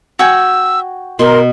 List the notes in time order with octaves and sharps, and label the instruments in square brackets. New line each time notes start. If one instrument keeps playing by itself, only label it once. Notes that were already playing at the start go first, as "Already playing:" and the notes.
[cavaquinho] F#4 G5 G#5 [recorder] E6
[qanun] B2 [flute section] A#4 [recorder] C6